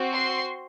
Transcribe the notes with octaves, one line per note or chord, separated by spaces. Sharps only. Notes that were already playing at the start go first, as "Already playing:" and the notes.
Already playing: C4 F#4
C6